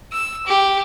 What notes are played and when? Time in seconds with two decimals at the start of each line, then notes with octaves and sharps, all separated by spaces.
0.12 E6
0.47 G4